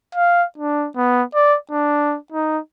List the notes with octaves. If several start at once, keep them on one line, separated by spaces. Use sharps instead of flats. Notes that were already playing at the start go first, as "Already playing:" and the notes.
F5
D4
B3
D5
D4
D#4